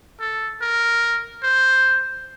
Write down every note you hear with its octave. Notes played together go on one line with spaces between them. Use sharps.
A4
A#4
C5